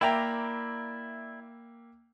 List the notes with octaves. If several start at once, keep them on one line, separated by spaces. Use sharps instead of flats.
A#3 E4 D5 E5 G5 A#5